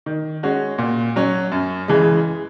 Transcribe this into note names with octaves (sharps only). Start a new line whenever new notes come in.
D#3
G#3 C#4 F#4
A#2
F#3 C#4
F#2
C#3 E3 G#3